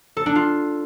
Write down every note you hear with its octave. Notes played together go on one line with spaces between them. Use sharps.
A4
D4
F4